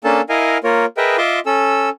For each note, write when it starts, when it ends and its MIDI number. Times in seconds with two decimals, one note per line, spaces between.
0.04 0.21 58
0.04 0.21 61
0.04 0.21 62
0.04 0.21 69
0.04 0.21 81
0.29 0.58 64
0.29 0.58 70
0.29 0.58 75
0.29 0.58 77
0.29 0.58 80
0.64 0.85 58
0.64 0.85 65
0.64 0.85 70
0.64 0.85 73
0.97 1.17 68
0.97 1.17 70
0.97 1.17 71
0.97 1.17 75
0.97 1.17 76
0.97 1.17 79
1.18 1.40 65
1.18 1.40 75
1.18 1.40 76
1.18 1.40 84
1.18 1.40 86
1.46 1.89 61
1.46 1.89 69
1.46 1.89 88